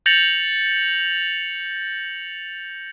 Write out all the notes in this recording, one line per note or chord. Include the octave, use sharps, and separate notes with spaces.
G6 A6 A#6 C#7 F7 F#7